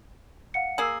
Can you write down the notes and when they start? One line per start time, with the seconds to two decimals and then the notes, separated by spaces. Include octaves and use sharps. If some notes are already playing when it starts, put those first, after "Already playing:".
0.54 F5 F#5 C#7
0.78 A#3 G#4 E6 C7 F#7